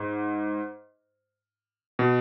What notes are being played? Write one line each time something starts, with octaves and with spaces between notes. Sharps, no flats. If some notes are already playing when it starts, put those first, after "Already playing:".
Already playing: G#2
B2